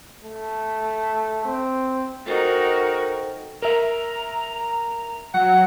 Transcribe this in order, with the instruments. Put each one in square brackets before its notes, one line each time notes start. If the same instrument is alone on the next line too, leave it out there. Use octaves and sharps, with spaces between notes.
[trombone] A3
C4
[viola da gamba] D#4 F#4 [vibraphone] A4 C5 G5 [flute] A#4
[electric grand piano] A#4 E5 [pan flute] A#5
[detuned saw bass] F#3 [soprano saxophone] F#5